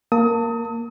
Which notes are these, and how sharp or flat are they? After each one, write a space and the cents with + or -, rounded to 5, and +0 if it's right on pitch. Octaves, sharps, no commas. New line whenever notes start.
A#3 +0 A5 +35 D#6 +30